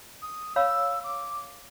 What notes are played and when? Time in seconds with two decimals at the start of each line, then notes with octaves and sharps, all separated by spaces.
0.22 D#6
0.56 C#5 F5 B5 E6
1.04 D6